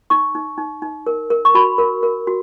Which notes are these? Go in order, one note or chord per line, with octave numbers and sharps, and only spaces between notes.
D#4 C#6
D#4
D#4
D#4
A#4
A#4
C#6
F#4 B5
A#4
A#4
F#4